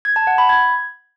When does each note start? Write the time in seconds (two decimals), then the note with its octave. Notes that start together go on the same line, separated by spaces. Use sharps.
0.05 G#6
0.16 A5
0.27 F#5
0.38 B5
0.49 G#6